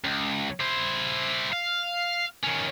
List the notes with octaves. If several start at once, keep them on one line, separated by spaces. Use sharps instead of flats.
C#2
E4 C5
F5
D#3 C#4